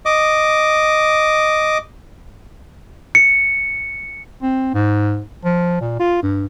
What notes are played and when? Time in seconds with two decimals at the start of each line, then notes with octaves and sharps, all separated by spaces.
0.05 D#5 D6
3.15 C#7
4.42 C4
4.74 G#2
5.45 F3
5.81 A#2
6.00 F4
6.23 G2